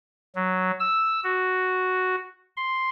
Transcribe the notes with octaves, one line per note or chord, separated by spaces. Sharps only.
F#3
E6
F#4
C6